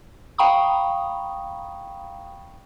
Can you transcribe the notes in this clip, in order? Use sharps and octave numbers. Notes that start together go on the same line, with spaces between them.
F5 G5 A#5 B5 C#6 D#6